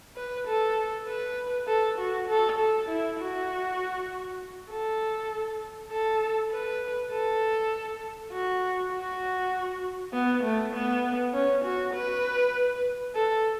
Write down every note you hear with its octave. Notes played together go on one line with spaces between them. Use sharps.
B4
A4
B4
A4
F#4
A4
A4
E4
F#4
A4
A4
B4
A4
F#4
F#4
B3
A3
B3
C#4
F#4
B4
A4